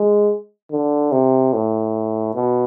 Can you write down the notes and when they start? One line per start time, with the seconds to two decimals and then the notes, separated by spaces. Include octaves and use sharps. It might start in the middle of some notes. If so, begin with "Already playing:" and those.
Already playing: G#3
0.72 D3
1.12 C3
1.53 A2
2.35 B2